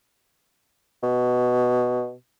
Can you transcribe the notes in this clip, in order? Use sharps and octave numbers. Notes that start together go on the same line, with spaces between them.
B2